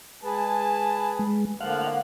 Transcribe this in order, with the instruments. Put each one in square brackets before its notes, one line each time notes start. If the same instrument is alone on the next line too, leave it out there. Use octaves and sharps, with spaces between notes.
[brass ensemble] G#3 G#5 A5 [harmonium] G#4 B4
[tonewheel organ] G#3
[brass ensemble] A2 F3 [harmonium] D3 A#3 [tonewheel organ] F5 F#5